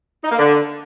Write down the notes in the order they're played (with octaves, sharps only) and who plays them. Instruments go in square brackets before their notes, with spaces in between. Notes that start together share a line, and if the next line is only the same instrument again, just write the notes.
[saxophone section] D#4
A#3
D3